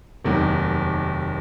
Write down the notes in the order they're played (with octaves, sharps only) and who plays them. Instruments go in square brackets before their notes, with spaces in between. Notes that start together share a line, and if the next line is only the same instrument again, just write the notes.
[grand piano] F1 D#2 D#3 F#3